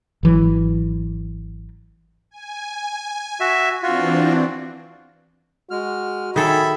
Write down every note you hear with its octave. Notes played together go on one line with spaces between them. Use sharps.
G#1 E3 F#3
G#5
F#4 E5
E3 C4 D4 F4 F#4
G#3 F#4 F6
D#3 G#4 A4 C#5 E5 B5